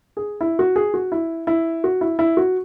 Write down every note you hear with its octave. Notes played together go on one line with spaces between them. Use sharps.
G#4
E4
F#4
G#4
F#4
E4
E4
F#4
E4
E4
F#4